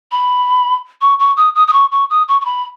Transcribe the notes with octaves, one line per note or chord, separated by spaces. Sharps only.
B5
C#6
C#6
D#6
D#6
D#6
C#6
C#6
D#6
C#6
C#6
B5